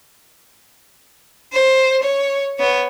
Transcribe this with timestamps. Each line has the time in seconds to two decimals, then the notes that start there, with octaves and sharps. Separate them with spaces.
1.53 C5
2.03 C#5
2.59 B3 C#5